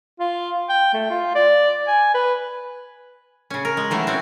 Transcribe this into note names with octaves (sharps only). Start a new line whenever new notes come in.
F4
G5
A3
F4
D5
G#5
B4
C#3 C#4
A#4
G#3
D#3 E3 F#3 A3
C4 C#4 F#4